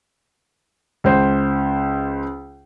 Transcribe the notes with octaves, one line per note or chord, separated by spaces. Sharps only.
C#2 C5